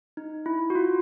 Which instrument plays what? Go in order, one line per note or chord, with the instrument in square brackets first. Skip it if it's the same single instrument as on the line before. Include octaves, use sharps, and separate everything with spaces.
[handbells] D#4
E4
F#4
F4